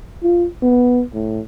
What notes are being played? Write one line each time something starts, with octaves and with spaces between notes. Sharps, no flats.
F4
B3
A2